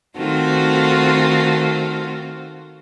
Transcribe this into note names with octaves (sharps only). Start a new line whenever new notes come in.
D#3 A3 C4 F4 F#4 A4